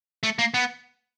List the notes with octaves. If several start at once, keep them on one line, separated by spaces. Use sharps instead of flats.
A3
A#3
B3